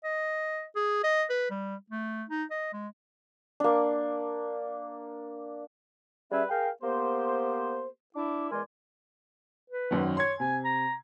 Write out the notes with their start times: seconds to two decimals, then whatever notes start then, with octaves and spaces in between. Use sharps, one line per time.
0.04 D#5
0.76 G#4
1.04 D#5
1.30 B4
1.50 G3
1.90 A3
2.29 D#4
2.51 D#5
2.73 G#3
3.60 A#3 D4
6.32 G3 C#4 G#4 B4 E5
6.49 G#4 A#4 F5 G5
6.83 A#3 B3 G4 C5
8.15 D4 E4 D6
8.51 E2 G#3 A#4 D5 G#5 C6
9.70 B4
9.91 G#1 F#2 D#3
10.17 C#5 C6 G#6
10.40 C3 G#5
10.65 A#5